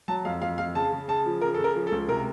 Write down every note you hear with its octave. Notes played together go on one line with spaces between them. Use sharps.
F#3 A5
F2 F5
F2 F5
F2 F5
C#3 A5
C#3
C#3 A5
F3
C#3 A#4
C#3 A4
A#4
F3
A4
C#2
C3 A#4